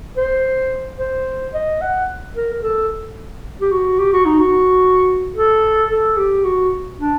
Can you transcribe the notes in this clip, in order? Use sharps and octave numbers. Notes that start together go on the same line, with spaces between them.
C5
C5
D#5
F#5
A#4
A#4
A4
G4
F#4
G4
F#4
D#4
F#4
A4
A4
G4
F#4
D4